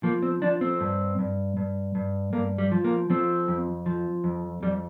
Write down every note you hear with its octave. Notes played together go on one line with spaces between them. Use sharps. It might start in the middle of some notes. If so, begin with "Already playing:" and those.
F3 A#3
C4
F3 D4
C4
G2
G2
G2
G2
G2 A#3
G3
F3
A#3
F3 C4
F2
F3
F2
F2 G3